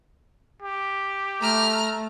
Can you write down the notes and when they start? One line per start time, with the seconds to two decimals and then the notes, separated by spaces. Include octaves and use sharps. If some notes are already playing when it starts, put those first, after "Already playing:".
0.62 G4
1.42 A3 A#5 F6